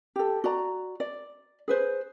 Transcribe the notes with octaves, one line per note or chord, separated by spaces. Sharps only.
G4 A4
F#4 D5 A#5
D5
G#4 B4 C5